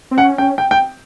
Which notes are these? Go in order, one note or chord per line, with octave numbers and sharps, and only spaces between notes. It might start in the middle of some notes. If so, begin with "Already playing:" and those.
C4
C#4 F#5
G5
G5
G5